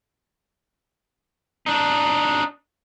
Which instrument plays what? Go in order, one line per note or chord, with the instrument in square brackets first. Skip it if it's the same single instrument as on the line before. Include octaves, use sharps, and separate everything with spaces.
[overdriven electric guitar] D4 D#4